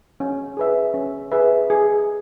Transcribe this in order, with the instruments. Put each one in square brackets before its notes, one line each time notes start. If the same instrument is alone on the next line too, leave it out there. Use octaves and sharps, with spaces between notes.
[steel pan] C#4
G#4 B4 E5
C#4
G#4 B4 E5
G#4